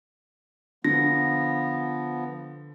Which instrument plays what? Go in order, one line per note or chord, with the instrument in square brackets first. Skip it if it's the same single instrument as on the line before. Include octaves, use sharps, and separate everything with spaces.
[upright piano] D3 [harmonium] F3 B3 [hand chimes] A#6